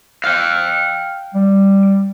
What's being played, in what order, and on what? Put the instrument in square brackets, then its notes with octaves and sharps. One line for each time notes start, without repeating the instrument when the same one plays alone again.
[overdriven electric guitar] F5 G5
[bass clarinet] G3